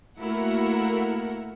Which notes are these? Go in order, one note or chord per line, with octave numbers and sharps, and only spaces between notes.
A3 A#3 E4 F#4 A#4 F#5